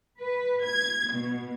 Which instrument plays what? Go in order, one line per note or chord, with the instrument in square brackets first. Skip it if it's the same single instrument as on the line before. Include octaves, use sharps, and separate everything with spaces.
[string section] B4
G#6
B2